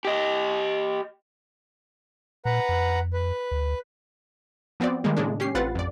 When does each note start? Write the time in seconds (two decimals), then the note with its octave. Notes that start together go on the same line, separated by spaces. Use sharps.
0.05 G4 D#5
2.45 A#2 B4 F#5 A#5
2.69 F2
3.13 B4
3.51 D2
4.80 F3 B3 C4 F#4 D5
5.04 D#3 G3 G#3 A#3
5.17 A2 C#3 G#3 A#3 D4
5.40 C#4 G4 C7
5.55 A1 C4 F4 B4 F#5 A6
5.75 F2 D5